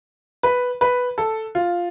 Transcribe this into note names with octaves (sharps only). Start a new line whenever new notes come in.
B4
B4
A4
F4